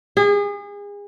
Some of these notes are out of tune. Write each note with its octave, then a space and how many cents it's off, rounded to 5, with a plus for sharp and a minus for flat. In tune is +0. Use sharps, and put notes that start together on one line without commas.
G#4 -35